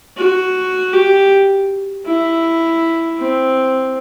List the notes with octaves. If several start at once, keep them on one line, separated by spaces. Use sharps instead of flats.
F#4
G4
E4
C4